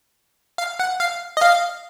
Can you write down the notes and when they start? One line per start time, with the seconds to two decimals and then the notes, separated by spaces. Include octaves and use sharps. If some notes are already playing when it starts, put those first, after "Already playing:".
0.58 F5
0.80 F#5
1.00 F5
1.37 D#5
1.41 F5